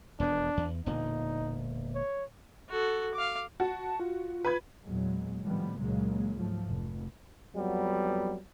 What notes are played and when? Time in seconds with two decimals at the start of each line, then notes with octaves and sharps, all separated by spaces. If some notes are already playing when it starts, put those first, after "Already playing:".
0.20 E1 F2 B3 D4
0.57 E2
0.86 E1 A#2 D3 D#4
1.95 C#5
2.69 F#4 A4
3.14 F5 D6
3.60 F#4 A5
4.00 F4
4.45 B4 B5 G#6
4.85 E2 A#2 F#3 G#3
5.42 A2 D#3 F3 G3 B3
5.78 C#2 A#2 C#3 F#3 G#3 A#3
6.37 G#2 F3 F#3 A3
6.69 F1
7.56 F2 F#3 G3 B3